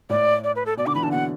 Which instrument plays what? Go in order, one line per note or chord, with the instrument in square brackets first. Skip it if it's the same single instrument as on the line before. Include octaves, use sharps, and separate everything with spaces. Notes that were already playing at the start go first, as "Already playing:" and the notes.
[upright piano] A2 [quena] D5
[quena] D5
B4
A4
[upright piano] B2 [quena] D5
[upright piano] D3 [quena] D6
[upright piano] E3 [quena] B5
[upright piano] D3 [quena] A5
[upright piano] B2 [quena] F#5